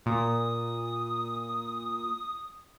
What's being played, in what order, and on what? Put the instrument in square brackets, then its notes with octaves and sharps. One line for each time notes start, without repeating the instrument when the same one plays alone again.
[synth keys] A#2 [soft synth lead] D#6